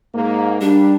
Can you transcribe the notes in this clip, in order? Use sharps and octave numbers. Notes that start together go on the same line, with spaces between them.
G#2 A#3
G3 D4